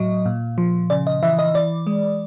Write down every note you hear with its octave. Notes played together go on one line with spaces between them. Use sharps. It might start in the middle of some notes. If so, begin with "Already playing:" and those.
Already playing: A2 F#3 D#5
A#2
F3
C#3 D5
D#5
E3 E5
D#5
E3 D5
G#3